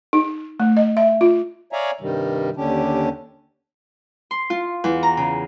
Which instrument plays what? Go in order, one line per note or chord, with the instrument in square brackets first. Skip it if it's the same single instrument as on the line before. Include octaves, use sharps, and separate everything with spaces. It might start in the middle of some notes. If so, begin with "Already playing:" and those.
[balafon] D#4
A3
D#5
E5
F4
[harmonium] C#5 D5 E5 F5 G#5 A#5
G2 C3 D#3 G3
D#2 D3 C#4 D4 G4
[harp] C6
F4
E2
A#5
C#3